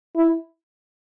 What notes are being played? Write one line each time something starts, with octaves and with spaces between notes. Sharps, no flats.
E4